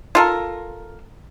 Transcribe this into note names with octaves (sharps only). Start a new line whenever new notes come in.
F4 A4 A#4